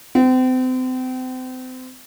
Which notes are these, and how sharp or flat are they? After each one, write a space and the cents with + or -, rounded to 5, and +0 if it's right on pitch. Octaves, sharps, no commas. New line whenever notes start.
C4 -35